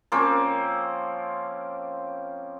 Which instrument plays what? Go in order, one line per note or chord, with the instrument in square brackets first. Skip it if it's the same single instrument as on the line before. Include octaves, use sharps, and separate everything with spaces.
[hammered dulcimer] F3 A#3 C4 C#4